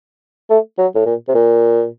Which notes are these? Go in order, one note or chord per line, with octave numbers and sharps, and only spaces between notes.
A3
F#3
A2
A#2
C3
A#2